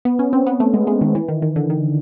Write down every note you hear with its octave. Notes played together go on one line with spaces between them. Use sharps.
B3
C#4
C4
B3
A3
G#3
G#3
D#3
E3
D#3
D#3
D3
D#3